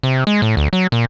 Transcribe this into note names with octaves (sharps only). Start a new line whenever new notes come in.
C3
G#3
A2
D2
F#3
A#2